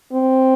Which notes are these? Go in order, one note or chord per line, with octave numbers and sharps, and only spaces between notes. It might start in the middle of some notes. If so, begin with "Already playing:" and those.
C4